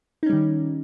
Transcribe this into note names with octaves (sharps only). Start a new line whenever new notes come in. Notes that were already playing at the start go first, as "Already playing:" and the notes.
D#3 G3 C#4 D#4